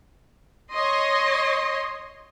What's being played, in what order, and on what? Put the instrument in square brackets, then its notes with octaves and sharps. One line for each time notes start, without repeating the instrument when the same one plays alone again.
[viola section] C#5 D#5 C6